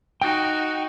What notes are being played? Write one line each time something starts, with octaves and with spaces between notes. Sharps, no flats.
D#4 F#4 G5